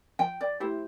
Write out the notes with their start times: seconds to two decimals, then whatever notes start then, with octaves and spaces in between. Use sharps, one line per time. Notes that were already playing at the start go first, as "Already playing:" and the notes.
0.19 F3 G5
0.41 D5
0.60 A3 E4 G4 C5